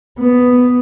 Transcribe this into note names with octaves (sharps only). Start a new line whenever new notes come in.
B3